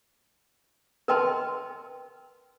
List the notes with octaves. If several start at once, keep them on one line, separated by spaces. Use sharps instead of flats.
A#4 B4 D#5 G5 A5 C6